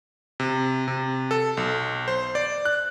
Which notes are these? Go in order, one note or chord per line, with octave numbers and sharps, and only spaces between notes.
C3
C3
A4
B1
C5
D5
F#6